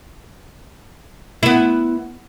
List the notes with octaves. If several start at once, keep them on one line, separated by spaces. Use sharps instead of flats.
B3 E4